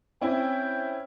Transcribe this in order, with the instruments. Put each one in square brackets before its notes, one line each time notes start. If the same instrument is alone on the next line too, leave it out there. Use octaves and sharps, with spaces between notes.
[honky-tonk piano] C4 C#4 E4 [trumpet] G5